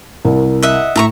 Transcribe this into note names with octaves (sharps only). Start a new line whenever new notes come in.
C2 A#4
D#5 E5 F#5
A2 E5 A#5 C#6